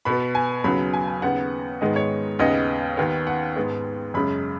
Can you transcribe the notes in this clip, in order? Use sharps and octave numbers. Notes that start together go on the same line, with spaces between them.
B2 B3 B5
G#5
D#2 C#3 F#3 B3 B5
G#5
G#5
D#2 C#3 B3 F#5
G#2 D#3 G#3 B3 D#5
C#5
D#2 C#3 B3 D#5
D#2 D#3 B3
F#5
G#2 G#3 B3
F#2 C#3 G#3 B5